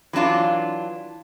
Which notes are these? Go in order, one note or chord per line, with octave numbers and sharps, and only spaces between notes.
E3 F#3 D4 F4